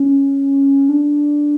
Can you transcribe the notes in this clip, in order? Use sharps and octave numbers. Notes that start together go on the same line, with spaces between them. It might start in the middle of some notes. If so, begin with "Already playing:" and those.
Already playing: C#4
D4